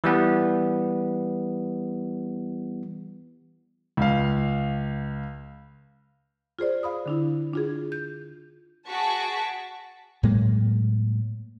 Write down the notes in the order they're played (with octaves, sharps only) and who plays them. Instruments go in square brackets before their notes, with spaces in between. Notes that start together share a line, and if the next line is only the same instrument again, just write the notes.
[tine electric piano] E3 G3 B3
[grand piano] C#2 F5
[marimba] F4 G#4 C5 D5
F5 B5 D#6
D3 D4 E4
D4 F4 G#4
G6
[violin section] F#4 G#4 A5 C#6 B6 D7
[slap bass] A2 F#3 G#3 A#3